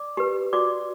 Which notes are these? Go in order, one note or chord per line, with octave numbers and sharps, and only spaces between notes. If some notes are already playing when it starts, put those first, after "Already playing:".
Already playing: D5 D6
G4 B4
F#4 D5 D6